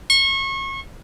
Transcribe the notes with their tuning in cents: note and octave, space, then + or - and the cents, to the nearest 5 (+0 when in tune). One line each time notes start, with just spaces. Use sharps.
C#6 -30